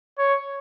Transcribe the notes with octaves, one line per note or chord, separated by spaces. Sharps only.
C#5